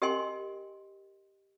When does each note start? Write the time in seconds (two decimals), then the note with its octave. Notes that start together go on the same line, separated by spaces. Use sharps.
0.02 G4 A#4 D#5 G5 G#5 C6